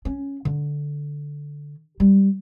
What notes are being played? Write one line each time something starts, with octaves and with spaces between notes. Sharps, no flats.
C#4
D3
G3